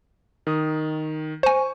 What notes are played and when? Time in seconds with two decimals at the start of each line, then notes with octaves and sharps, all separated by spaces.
0.47 D#3 D#6
1.43 C5 G#5 C#6